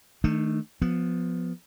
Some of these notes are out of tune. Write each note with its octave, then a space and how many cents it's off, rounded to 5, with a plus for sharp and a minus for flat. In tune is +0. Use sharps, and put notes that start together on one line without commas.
D#3 +20 A3 +0 D4 +45
F3 +15 B3 +0